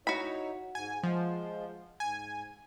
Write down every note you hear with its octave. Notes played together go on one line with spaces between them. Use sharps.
D#4 E4 F#4 C#5 B5
G#2 G#5
F3 G#3 C5
G#2 G#5